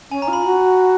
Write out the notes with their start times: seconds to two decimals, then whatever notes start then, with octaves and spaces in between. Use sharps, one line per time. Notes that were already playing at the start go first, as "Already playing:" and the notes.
0.11 C#4 G#5
0.22 A#5
0.28 F4
0.33 B5
0.45 F#4